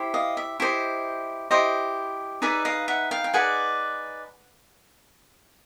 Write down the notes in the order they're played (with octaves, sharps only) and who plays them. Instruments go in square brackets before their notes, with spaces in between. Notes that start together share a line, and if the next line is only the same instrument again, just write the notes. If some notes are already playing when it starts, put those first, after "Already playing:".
Already playing: [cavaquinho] E4 G4 C5
D#5 F5
E5
E4 G4 C5 D#5
E4 G4 C5 D#5
D#4 G#4 B4 D5 E5
D#5 F5
E5 F#5
F5 G5
G5
D#4 G#4 B4 D5 F#5 G#5